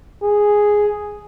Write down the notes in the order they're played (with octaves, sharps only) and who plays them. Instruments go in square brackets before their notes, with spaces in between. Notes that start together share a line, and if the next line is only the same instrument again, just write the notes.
[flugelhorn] G#4